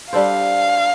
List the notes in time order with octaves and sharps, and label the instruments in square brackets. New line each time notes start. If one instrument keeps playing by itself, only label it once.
[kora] G3 D4 A4 C5 [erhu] F5